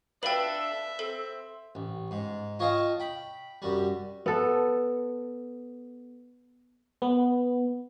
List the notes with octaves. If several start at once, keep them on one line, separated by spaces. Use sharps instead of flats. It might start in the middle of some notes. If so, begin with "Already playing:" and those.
D4 A4 B4 E5 F5 G5 F#7
C4 A4
A1
G#2
F4 C#5 D#5 F5 G5 A5
G5 B5
F#2 G3
B3 A4
B3